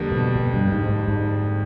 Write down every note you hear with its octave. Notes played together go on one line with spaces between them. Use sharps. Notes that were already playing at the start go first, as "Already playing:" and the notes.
Already playing: F2 D3 G3 A#3 D4
B2
B2
G2
G#2
G#2
G#2